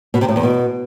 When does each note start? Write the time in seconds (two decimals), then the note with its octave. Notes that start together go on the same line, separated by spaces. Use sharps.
0.14 B2
0.21 C3
0.29 A2
0.36 E2
0.43 B2